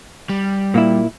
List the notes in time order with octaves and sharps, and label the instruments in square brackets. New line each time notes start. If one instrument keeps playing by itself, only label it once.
[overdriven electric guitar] G3
[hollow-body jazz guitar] A#2 A#3 E4